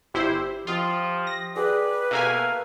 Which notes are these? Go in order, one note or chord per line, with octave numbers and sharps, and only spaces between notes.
G1 E4 G4 C5 E5
F3 F4 D#5 G5
A#6
G#4 B4 D5 G5
B2 A#3 A4 A#4 E5 F5 G#5